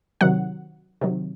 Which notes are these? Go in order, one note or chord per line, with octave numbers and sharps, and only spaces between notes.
C3 D#3 F#3 F#5
C3 D#3 F#3